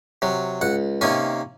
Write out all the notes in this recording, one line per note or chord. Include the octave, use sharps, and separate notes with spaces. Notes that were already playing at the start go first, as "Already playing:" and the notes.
C3 F#3
C#2 F#5
C3 D#3 A#3 C#4 G#5